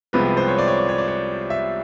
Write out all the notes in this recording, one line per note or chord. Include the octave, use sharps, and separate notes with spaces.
C2 C3 F3 G#3 B3 B4
B4
C5
C#5
D5
C#5
D5
C#5
D5
C#5
E5